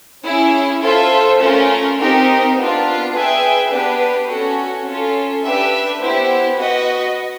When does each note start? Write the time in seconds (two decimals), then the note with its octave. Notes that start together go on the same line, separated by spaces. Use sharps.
0.24 C#4 E4 G#4
0.82 F4 A4 C5 E5
1.40 A3 C#4 F4 A#4
1.97 C4 D#4 G4 A#4
2.55 B3 D4 F4
3.12 G#4 B4 E5 G5
3.70 B3 D4 G4 B4
4.28 C#4 F#4 A4
4.85 C#4 F4 A4
5.42 D4 G4 B4 E5
6.01 B3 E4 G4 C5
6.58 F#4 B4 D#5